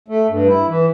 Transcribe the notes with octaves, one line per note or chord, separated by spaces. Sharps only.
A3
G2
E4
E3